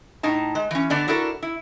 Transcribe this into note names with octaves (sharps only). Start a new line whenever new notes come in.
A2 D#4 A5
G#3
E3 C#4
D3 B3 D4 D5
D4 E4 F#4 A4 A#4
E4